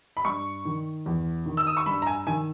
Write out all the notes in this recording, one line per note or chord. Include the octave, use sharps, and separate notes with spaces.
B5
G2 C#6
D#3
E2
D#3
E6
D#6
C#6
G2 B5
A#5
G#5
D#3 G#5